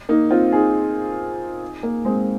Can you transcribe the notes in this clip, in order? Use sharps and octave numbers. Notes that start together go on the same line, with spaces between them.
A#3 D#4
C4 F4
D#4 G#4
A#3
G#3 C4